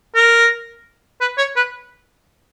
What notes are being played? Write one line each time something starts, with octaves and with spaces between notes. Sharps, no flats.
A#4
B4
C#5
B4